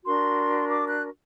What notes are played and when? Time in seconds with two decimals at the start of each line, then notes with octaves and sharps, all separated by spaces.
0.04 D4 F#4 A#4 C6
0.70 D6
0.86 F#6